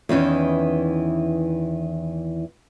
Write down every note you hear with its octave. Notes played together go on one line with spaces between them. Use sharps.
E2 D#3 E3 C#4